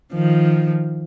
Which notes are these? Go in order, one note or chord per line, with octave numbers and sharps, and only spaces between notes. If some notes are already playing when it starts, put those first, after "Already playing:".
D#3 F3